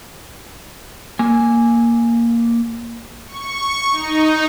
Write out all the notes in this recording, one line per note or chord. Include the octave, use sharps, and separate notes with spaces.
A#3 G#5
C#6
D#4